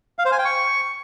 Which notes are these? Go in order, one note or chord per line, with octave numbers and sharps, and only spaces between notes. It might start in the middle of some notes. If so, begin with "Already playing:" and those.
F5
C5
G#5
G5
C#6